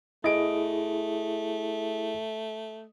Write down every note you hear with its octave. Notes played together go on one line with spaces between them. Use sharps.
A3 E4 G#4 D#5 D7